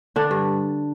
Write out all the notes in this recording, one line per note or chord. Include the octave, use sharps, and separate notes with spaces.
D3 D4
G2